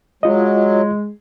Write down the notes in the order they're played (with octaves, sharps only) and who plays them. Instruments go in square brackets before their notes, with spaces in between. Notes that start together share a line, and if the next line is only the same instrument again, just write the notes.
[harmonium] F#3 [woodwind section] G#3 [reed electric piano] F4 D#5